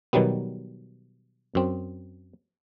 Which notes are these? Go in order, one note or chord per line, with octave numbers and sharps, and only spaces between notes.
B2 D#3 F#3 G3 B3
F#2 C4